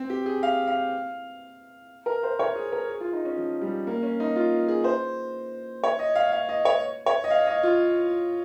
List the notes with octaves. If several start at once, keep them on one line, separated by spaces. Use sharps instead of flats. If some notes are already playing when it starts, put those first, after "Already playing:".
Already playing: C4
G4
G#4
F5
F5
A#4
C5
C#5
G#4
A#4
G#4
F4
D#4
C#4
F3
G3
A#3
C#4
D#4
F4
G#4
C5
C#5
D#5
F5
F5
D#5
C#5
C#5
D#5
F5
D#5
F4